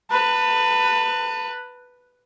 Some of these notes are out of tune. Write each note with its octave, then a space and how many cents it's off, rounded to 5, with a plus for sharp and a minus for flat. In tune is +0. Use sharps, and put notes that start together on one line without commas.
B4 +0 A5 +35